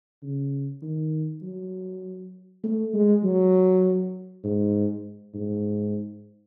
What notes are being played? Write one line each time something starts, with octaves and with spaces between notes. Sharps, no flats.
C#3
D#3
F#3
A3
G#3
F#3
G#2
G#2